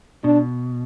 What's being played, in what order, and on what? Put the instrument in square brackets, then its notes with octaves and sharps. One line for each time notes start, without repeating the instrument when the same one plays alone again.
[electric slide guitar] B2 [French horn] D4